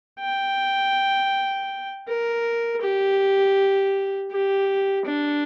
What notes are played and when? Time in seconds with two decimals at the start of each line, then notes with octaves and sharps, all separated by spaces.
0.20 G5
2.08 A#4
2.82 G4
4.31 G4
5.05 D4